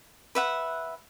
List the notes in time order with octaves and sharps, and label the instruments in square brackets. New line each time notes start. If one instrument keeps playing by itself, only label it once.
[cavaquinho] B4 E5 F#5